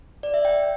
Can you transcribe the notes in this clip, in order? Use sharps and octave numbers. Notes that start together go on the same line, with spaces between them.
D5
E5
G5